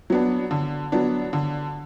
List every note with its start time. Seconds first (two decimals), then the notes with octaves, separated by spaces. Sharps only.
0.10 F#3 B3 D4
0.51 D3
0.92 F#3 B3 D4
1.33 D3